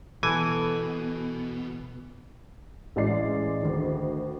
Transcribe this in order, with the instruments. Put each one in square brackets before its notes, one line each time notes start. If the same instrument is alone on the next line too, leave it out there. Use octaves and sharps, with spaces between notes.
[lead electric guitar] B2 [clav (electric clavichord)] E3 G#5 [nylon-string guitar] A4
[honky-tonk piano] A1 G#3 C#4 D5 C7
D2 D#3